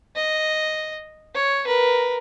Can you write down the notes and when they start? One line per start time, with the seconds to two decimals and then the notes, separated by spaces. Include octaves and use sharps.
0.16 D#5
1.35 C#5
1.66 A#4 B4